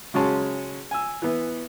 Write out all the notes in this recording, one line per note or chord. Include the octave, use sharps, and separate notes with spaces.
C#3 F#3 G#3 C#4 A5 C6
G#5 E6
E3 B3